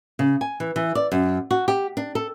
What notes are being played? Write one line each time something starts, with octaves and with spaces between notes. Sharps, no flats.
C#3
G#5
E3
E3
D5
F#2
F#4
G4
D4
A4